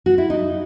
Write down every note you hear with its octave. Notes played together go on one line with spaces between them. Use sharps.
F#4
E4
D#4